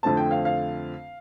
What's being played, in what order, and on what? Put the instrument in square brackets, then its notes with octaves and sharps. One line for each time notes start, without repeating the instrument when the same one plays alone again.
[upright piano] F2 D3 A3 C4 A5
G5
F5
F5